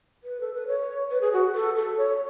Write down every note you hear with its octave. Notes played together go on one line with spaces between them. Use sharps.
B4
A4
B4
C#5
B4
G#4
F#4
A4
A4
C#5